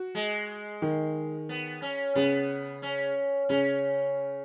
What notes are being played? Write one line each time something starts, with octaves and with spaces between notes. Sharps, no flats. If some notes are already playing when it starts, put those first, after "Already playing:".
Already playing: F#4
G#3
D#3
B3
C#4
C#3 B3
C#4
C#3 C#4